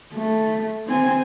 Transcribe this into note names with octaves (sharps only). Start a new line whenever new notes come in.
A3
C4 G#5